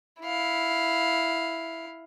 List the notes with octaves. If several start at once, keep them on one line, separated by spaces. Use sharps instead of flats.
E4 F5